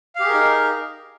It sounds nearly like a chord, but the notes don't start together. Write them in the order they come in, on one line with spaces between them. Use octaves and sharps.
F5 G4 G#4 A#4 D#4